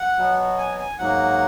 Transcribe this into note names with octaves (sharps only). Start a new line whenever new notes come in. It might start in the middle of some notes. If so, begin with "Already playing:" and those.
Already playing: F#5
B2 F#3 B3
G#5
G#5
G#2 F#3 A#3 F#5